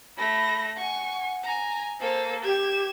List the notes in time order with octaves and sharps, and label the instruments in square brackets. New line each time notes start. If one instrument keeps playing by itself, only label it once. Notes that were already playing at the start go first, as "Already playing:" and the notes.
[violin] A3 A#6 [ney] B5
[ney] F#5 [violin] G#5 C#6
[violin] G#5 A#5
[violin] A#3 A4 [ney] C5
[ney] G4 [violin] G#6 E7